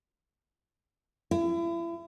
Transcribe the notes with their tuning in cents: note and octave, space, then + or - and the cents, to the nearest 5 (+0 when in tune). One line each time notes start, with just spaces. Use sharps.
E4 +35